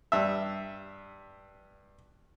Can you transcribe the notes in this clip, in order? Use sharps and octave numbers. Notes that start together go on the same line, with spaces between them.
G2 E5